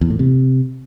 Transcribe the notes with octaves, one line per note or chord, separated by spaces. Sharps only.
E2
A2
C3